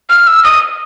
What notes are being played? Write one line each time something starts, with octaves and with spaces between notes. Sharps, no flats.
F6
E6
D#6